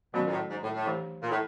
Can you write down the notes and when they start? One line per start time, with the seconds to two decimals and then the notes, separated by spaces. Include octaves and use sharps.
0.14 B2 D#3 F#3 A3 C#4 F#4
0.27 A#2
0.31 A2
0.50 G#2
0.62 A2
0.74 A2
0.86 E3 A3 D4 G4 C5
1.22 A#2
1.30 A2